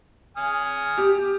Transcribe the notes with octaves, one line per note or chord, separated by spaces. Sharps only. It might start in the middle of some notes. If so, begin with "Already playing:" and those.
G#5 D#6 F6
G4